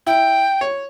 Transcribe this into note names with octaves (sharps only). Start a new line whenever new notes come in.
E4 G5
C#5